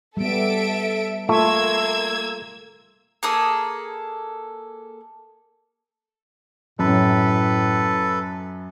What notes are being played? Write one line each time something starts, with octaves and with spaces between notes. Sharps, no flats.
G3 B3 A4 E5 D7
A3 A#3 F4 E6 G#6
A#3 G#4 A4 D#6
F#2 A2 A4 B4